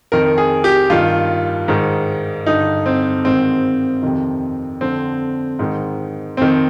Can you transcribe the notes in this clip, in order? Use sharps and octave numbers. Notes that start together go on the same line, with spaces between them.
F2 D#3 A#4
G#4
G4
G2 D#3 F4
G#2 D#3
G2 D3 D#4
C4
G#2 D#3 C4
F2 C3 D#3
F2 D3 C4
G#2 D#3
F2 D#3 C4